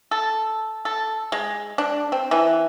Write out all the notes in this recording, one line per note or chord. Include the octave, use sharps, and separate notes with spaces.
A4
A4
G#3
D4
C4
E3